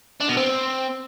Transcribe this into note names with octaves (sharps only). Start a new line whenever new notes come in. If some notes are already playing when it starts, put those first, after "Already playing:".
D4
B2
C4